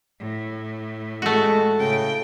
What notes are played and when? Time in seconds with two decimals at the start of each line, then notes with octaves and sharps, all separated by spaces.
0.20 A2
1.22 G#3 A3 F#4
1.79 A2 C#3 G5